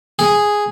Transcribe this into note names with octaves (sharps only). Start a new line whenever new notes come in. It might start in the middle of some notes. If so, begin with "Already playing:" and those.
G#4